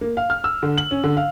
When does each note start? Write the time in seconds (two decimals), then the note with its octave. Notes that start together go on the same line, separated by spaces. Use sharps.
0.01 A#3
0.17 F5
0.30 F6
0.44 E6
0.63 D3
0.78 F#7
0.91 C#4
1.04 D3
1.17 F5